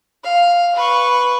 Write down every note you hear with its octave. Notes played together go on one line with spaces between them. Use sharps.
F5
B4 C#6